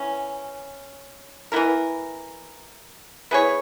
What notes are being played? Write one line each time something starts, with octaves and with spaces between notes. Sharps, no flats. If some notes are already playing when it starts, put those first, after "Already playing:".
Already playing: E3 C#4
E3 B3 E4 A#4
B3 E4 G#4 C#5